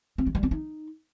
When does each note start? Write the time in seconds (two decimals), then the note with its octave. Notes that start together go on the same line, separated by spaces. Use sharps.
0.18 C4
0.27 G#3
0.35 G3
0.43 C4
0.51 D#4